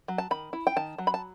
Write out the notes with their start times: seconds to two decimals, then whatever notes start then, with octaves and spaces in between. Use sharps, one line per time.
0.08 F#3
0.18 A5
0.31 D#3 B5
0.53 E4
0.67 G5
0.76 D#3 A5
0.98 F#3
1.07 B5
1.14 A5